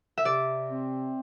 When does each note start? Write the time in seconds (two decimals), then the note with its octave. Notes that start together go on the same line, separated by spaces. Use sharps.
0.18 E5
0.25 C3 D5
0.70 C4